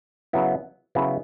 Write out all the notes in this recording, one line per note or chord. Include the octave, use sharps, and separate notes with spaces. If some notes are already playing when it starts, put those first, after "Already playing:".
C#3 F#3 B3 E4
C#3 F#3 B3 E4